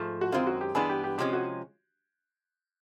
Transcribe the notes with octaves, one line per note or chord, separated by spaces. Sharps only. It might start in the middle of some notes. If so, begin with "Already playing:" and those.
Already playing: G#2 F3 A3
F#4
F#2 D#3 G#3 C4 F4
F#4
G4
G2 E3 G#3 B3 D4 G#4
G4
G4
C3 F3 G#3 C#4 G4
F#4